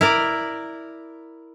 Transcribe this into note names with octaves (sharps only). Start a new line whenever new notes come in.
E4 A#4 D5